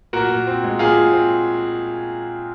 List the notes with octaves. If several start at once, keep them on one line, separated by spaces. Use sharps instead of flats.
A#2 F#4 A#4
A#2
C4
G#3
A#2 F4 G#4
A#2
C4